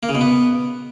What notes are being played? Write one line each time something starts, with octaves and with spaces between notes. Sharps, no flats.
A#3
C#3
B2
B3